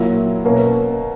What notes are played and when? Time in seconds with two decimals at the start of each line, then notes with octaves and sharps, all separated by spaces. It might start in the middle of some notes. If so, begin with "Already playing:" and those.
Already playing: A#2 F#3 A#3 E4
0.44 B2 A#3 C#4